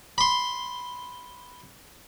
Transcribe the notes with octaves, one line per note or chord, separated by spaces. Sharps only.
B5 C6